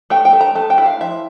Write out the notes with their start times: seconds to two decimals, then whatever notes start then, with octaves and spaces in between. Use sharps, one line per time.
0.10 A3 G5
0.25 G5
0.33 A3
0.41 A#5
0.55 A3 A5
0.70 G5
0.78 E4
0.86 F5
1.01 F3 E5